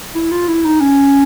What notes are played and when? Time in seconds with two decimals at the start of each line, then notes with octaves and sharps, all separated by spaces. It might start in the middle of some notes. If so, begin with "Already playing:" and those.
0.15 E4
0.31 F4
0.48 E4
0.65 D#4
0.81 C#4